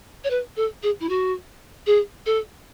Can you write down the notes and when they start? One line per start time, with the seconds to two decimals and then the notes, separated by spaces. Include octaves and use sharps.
0.24 C#5
0.30 B4
0.56 A4
0.83 G#4
1.00 E4
1.09 F#4
1.86 G#4
2.26 A4